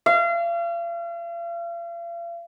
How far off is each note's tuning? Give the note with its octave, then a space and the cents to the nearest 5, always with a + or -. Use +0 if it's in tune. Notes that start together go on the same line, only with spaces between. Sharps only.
F5 -40